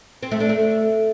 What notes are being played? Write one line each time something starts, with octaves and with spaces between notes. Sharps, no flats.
C4
A3
D4
A3